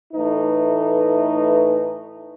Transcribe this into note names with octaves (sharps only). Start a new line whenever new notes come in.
A2 E3 A3 D#4 B4